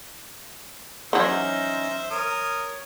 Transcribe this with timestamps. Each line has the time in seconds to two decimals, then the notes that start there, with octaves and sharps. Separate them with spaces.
1.13 E3 F#3 C#4 D#4 C5 D#5 E5
2.11 A#4 C#5 D#6